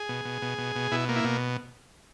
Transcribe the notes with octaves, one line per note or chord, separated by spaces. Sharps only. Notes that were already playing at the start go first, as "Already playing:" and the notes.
Already playing: G#4
B2
B2
B2
B2
B2
B2 E4
A#3
E4
B2